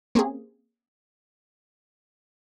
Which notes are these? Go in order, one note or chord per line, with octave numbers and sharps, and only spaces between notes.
A#3 C4 C#4 G4 G#4